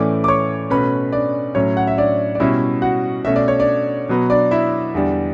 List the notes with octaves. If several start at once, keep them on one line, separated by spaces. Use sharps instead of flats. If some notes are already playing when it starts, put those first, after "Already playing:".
Already playing: A2 E3 A3 C#4 D5 D6
D6
C#5 C#6
B2 A3 C#4 B4 B5
D4 D5
A2 F#3 C#4 C#5
F#5
E5
D4 D5
D5
B2 G3 C#4 E4 E5
F#4 F#5
B2 A3 C#4 E5
D5
C#5
D4 D5
B2 F#3 B3
D4 D5
E4 E5
E2 D3 G3 D4